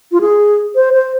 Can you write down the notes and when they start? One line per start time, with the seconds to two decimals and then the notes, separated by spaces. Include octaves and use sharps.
0.12 F4
0.21 G#4
0.75 C5
0.93 C5